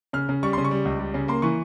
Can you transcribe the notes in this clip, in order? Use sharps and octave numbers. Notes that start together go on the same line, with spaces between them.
C#3 F6
C#3
G3 C#6
C#3 C6
C#6
G3
C#2
G3
C#3
A#3 C6
E3 C#6